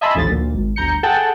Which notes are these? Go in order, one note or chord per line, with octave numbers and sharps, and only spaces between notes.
D#5 E5 G#5 A5 B5 C6
A1 D#2 A2 F3 A6
D2 A#2
G#1
G1 D2 A#5 G6 C#7
G#4 A4 F#5 G5 A5